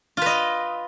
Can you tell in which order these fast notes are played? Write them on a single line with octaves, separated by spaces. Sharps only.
F4 B4 D#5